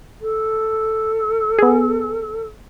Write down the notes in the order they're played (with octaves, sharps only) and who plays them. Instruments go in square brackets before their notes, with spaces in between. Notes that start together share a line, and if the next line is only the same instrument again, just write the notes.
[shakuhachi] A4
[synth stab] B3 G#4